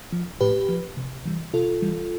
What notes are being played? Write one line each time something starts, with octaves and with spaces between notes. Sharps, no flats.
F3
A2 G4 B4
F3
C3
E3 G3
C3 F4 A4
E3 G3